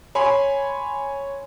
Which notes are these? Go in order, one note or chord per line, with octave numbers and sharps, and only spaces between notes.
C#5 G#5 B5 C6